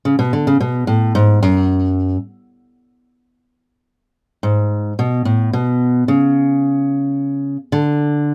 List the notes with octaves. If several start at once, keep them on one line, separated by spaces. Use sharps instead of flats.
C#3
B2
D3
C#3
B2
A2
G#2
F#2
G#2
B2
A2
B2
C#3
D3